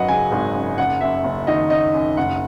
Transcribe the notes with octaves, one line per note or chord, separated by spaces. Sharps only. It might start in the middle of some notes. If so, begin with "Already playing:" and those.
Already playing: G#1 F#2 F#3 B4 D#5 F#5
C#3 G#5
G#1
F#2
F#1 F#5
F#2 E5
F#1
D#3 D#5
F#1 D#5
F#2
F#1 F#5